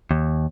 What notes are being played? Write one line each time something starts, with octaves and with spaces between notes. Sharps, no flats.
D#2